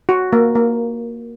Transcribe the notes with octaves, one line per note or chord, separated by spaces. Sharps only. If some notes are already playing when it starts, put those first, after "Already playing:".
F#4
A#3
A#3